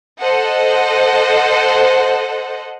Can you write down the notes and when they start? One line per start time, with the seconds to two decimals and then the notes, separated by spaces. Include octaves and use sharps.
0.21 A4 C5 D#5 F#5